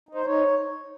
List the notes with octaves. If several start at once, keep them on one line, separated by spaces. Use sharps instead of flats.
D#4
C5
D#4 C#5